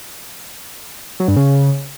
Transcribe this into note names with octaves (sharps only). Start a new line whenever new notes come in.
F#3
G2
C#3